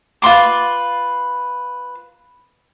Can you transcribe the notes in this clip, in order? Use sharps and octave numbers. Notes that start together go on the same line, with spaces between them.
F4 B4 C6 D6